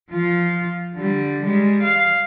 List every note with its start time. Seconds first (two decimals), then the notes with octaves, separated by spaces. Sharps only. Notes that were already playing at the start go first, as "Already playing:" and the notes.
0.11 F3 F4
0.95 D3 G3
1.45 G3 G#3
1.83 F5